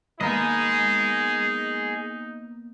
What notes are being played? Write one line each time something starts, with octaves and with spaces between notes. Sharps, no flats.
A#3 B3 D#4 G#4 D#5